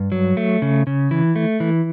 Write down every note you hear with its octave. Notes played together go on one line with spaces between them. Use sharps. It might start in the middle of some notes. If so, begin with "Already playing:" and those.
Already playing: G2
F#3
A3
C#3
C#3
E3
A3
E3